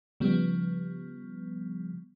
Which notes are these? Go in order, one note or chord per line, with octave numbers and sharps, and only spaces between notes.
C#3 F3 G3 B3